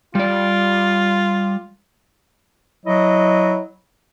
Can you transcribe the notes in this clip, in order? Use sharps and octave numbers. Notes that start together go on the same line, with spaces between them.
G3 F4 D5
F#3 E4 D#5